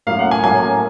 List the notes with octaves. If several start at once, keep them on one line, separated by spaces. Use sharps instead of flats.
A2 F#3 A#3 C#4 F5
F#5
G#5
A2 F#3 A#3 C#4 G#5